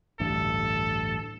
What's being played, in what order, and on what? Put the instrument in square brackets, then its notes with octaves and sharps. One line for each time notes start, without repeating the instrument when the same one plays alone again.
[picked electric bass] A1 D2 G2 [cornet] A4